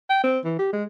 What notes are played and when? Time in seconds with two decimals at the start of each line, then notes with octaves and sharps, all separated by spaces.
0.10 G5
0.24 C4
0.44 E3
0.59 G4
0.73 G#3